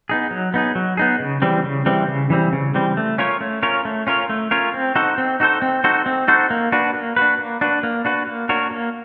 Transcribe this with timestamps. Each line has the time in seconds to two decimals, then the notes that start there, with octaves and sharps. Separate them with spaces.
0.09 B3 D#4 G#4
0.31 F#3
0.54 B3 D#4 G#4
0.75 F#3
0.97 B3 D#4 G#4
1.20 C#3
1.42 E3 G3 C4
1.64 C#3
1.86 E3 G3 C4
2.08 C#3
2.30 E3 G3 C4
2.53 C#3
2.74 E3 G3 C4
2.97 A3
3.18 C#4 F4 A#4 C#5
3.41 A3
3.63 C#4 F4 A#4 C#5
3.85 A3
4.07 C#4 F4 A#4 C#5
4.29 A3
4.51 C#4 F4 A#4 C#5
4.74 C4
4.95 D#4 F#4 A4 C5
5.18 C4
5.40 D#4 F#4 A4 C5
5.62 C4
5.84 D#4 F#4 A4 C5
6.06 C4
6.28 D#4 F#4 A4 C5
6.50 A#3
6.72 D4 F#4 B4
6.95 A#3
7.16 D4 F#4 B4
7.39 A#3
7.61 D4 F#4 B4
7.83 A#3
8.05 D4 F#4 B4
8.27 A#3
8.49 D4 F#4 A#4 C#5
8.71 A#3